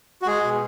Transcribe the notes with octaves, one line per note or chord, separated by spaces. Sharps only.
F#4
G#3 G#4
B2